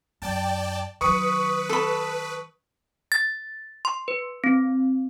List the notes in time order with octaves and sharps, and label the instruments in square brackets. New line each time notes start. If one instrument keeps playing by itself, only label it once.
[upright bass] F#2 [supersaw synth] D5 G5 A5
[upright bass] D#3 F#3 [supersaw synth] B4 [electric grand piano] C#6 D#6 C#7
[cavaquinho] A4 B5
[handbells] A6
C6
B4
C4